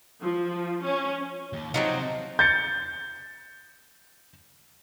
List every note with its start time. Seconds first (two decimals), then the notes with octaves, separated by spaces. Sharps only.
0.21 F3
0.84 C#4
1.53 D#2
1.74 C3 F3 F#3 C4 D#4
2.39 G6 A6 C#7